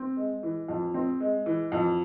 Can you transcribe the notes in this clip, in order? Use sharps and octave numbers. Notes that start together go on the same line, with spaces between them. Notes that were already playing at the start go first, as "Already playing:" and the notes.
Already playing: C4
G#3
E3
F2
C4
G#3
E3
F2